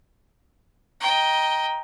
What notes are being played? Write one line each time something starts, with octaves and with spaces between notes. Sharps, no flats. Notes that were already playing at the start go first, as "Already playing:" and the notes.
D#5 G5 A#5